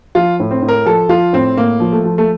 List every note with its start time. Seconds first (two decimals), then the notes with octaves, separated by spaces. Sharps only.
0.15 F3 F4
0.40 A2
0.51 C4
0.62 A2
0.68 A#4
0.86 F3 A4
1.09 F3 F4
1.33 A2 C4
1.57 A2 A#3
1.80 F3
1.92 A3
2.04 F3
2.18 A3